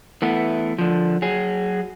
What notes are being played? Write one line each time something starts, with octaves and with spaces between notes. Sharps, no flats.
E3 A3 B3
D3 F3
F#3 G#4